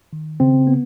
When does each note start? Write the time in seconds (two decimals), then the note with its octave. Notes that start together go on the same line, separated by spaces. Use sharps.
0.13 D#3
0.40 C#3 C4
0.67 B3